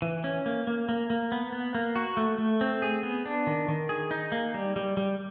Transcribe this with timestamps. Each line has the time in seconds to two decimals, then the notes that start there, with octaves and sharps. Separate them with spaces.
0.02 E3
0.24 C#4
0.46 A#3
0.67 A#3
0.89 A#3
1.10 A#3
1.32 B3
1.52 B3
1.75 A#3
1.96 F#4
2.17 A3
2.38 A3
2.61 C4
2.82 G#4
3.03 B3
3.25 D4
3.47 D#3
3.68 D#3
3.89 G#4
4.11 D#4
4.32 A#3
4.54 G3
4.76 G3
4.97 G3